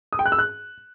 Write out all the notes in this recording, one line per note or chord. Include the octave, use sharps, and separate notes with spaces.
D#6
G5
F#6
E6
F#6